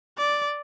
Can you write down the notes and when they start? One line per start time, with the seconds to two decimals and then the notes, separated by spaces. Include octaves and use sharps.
0.18 D5